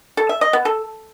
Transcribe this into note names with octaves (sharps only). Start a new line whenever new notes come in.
A4
E5
D#5
B3
A4